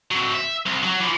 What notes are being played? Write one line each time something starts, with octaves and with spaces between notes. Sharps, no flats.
F#3 C4
E5
C2
F#3
E3 F3